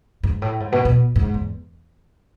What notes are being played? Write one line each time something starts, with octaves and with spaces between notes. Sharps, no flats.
G#2
A2
G#2
B2
B2
G#2
E2